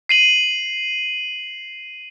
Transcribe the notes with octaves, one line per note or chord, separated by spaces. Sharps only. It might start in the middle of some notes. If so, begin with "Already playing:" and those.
C7 D#7 F#7